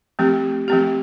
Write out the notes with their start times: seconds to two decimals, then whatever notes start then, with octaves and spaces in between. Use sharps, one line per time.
0.19 F3 A3 C4 G4
0.68 F3 A3 C4 G4